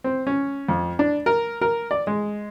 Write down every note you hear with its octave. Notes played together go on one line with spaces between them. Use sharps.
C4
C#4
F2
D4
A#4
A#4
D5
G#3